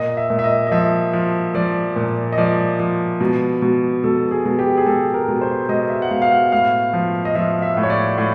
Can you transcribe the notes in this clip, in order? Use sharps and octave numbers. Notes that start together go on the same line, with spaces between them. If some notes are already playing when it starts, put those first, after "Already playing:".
Already playing: A#2 D#5
E5
A#2
E5
D#5
D#5
F3 E5
F3
F3 D5
A#2
D#5
F3 D5
F3
B2
B2
B2 A4
G#4
B2
G4
G#4
B2 A4
A#4
B2
C5
B2 D#5
E5
F#5
B2 F5
F5
F#5
A2 F5
F3
D#5
F3 E5
E5
A2
C#5
D5
A2